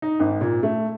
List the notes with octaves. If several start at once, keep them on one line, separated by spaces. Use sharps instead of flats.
D#4
G#1
A#2
A3